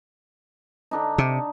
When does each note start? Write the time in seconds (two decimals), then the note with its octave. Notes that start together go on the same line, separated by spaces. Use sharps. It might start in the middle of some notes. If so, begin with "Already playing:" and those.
0.91 D3 D4 D#4
1.18 C3